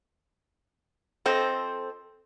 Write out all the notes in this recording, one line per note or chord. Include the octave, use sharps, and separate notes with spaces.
F3 C4 A4 C5 D#5